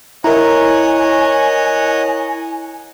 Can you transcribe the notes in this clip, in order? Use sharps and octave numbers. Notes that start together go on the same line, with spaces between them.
E4 A#4 C#5 D#5 F#5 G#5 A#5